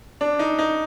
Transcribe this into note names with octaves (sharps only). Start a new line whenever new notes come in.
D4
D#4
D#4